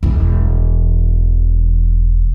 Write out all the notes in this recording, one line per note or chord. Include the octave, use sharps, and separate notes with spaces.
E1 E3